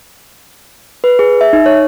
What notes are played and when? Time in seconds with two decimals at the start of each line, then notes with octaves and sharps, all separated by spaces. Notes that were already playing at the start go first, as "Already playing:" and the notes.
1.04 B4
1.19 G#4
1.41 E5
1.53 D#4
1.66 C#5